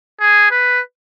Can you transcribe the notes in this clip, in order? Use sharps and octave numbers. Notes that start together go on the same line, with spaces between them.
G#4
B4